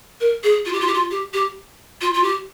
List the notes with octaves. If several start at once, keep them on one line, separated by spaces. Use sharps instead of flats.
A#4
G#4
F4
G4
F4
G4
F4
G4
G4
F4
F4
G4